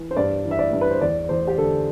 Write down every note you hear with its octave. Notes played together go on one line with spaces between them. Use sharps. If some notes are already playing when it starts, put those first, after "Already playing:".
Already playing: E3
C5
G2 D5
E3
E5
D5
G2
B4
C5
E2 D5
E2 C5
G4
D3 A4